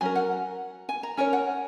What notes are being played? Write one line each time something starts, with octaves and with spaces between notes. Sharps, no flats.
F#3 C#4 A#4 G#5
F#5
G#5
A#5
C#4 A#4 C#5 G#5
F#5